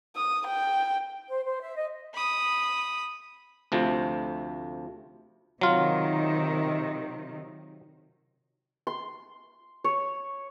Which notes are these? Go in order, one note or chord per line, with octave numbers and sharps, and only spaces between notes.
D#6
G5
C5
C5
E5
D#5
B5 D#6
D2 C3 F3 A3
C3 D#3 F#3 F4
C6
C#5